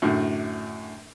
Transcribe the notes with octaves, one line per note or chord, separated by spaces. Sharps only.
F#2 A2 D3